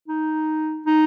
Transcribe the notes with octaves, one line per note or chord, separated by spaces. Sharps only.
D#4
D#4